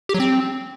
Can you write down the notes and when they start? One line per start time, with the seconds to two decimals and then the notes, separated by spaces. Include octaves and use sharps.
0.09 G4
0.14 F#3
0.20 C4